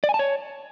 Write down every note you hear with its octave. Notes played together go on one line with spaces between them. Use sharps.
D5
G#5
A5
C#5